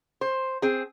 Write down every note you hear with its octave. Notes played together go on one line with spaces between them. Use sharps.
C5
C4 G#4